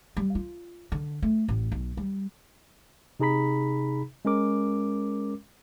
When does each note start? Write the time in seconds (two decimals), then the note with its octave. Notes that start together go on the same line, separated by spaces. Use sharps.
0.17 G3
0.35 F4
0.92 D3
1.22 A3
1.48 A1
1.72 B1
1.97 G3
3.20 C3 D#4 G#4 A#5 B5 B6
4.25 G#3 C#4 A#4 D6